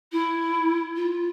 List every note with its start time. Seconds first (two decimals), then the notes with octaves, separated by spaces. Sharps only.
0.12 E4
0.96 F4